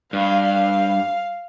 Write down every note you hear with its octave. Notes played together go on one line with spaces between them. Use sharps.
G2 F5